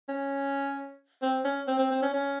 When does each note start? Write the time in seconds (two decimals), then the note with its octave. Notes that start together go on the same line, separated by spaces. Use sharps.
0.09 C#4
1.22 C4
1.45 C#4
1.68 C4
1.79 C4
1.91 C4
2.02 C#4
2.14 C#4